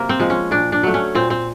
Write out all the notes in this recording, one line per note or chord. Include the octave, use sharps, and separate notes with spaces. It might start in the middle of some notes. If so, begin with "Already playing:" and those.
Already playing: C3 A#3
C4
F3 G#3
C#4
A#2 D4
D4
F#3 A3
C#4
A#2 C4
C4